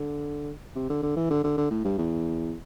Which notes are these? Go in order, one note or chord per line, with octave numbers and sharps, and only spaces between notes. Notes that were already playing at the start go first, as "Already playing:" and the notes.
Already playing: D3
C3
D3
D3
E3
D3
D3
D3
A2
G2
E2